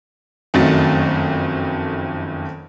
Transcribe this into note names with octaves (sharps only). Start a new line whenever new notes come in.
F#1 F2 D#3 F#3 A3 A6